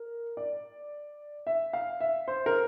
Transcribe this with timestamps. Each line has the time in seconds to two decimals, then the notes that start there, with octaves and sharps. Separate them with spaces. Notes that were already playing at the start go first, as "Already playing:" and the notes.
Already playing: A#4
0.37 D5
1.47 E5
1.73 F5
2.01 E5
2.28 C5
2.46 A#4